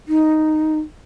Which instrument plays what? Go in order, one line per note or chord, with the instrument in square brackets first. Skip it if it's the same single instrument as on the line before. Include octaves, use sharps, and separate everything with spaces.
[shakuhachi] D#4